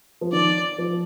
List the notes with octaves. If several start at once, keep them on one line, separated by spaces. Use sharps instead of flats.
F3
D#3 D5
F3